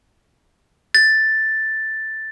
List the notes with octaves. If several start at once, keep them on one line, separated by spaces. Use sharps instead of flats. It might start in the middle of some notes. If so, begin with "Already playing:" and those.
A6